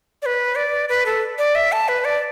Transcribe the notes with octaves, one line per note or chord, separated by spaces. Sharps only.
D5
B4
D5
B4
A4
D5
E5
A5
B4
D5